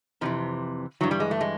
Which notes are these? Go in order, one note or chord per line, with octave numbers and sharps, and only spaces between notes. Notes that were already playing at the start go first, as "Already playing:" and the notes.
F2 C3 E3 F3
G2 E3 F#3
G3
G#3
A3
G#3